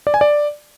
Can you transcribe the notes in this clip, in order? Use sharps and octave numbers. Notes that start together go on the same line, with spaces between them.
D5
G#5
D5